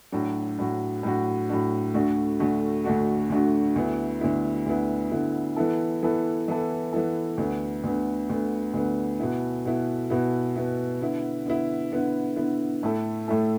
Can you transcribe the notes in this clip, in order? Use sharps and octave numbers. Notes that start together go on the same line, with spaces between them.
A2 F#3 D4 F#4
A2 F#3 D4 F#4
A2 F#3 D4 F#4
A2 F#3 D4 F#4
D2 D3 A3 D4 F#4
D2 D3 A3 D4 F#4
D2 D3 A3 D4 F#4
D2 D3 A3 D4 F#4
D2 D3 B3 E4
D2 D3 B3 E4
D2 D3 B3 E4
D2 D3 B3 E4
E3 B3 E4 A4
E3 B3 E4 A4
E3 B3 E4 A4
E3 B3 E4 A4
D2 D3 B3
D2 D3 B3
D2 D3 B3
D2 D3 B3
B2 B3 E4
B2 B3 E4
B2 B3 E4
B2 B3 E4
D3 B3 E4
D3 B3 E4
D3 B3 E4
D3 B3 E4
A2 A3 E4 A4
A2 A3 E4 A4